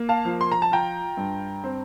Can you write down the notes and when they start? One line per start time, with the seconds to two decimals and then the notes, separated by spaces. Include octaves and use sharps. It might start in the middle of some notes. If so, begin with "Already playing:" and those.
Already playing: A#3
0.09 F5 A5
0.25 F3
0.41 C6
0.52 A#5
0.62 A5
0.72 F4 G5 A#5
1.17 G2
1.64 C4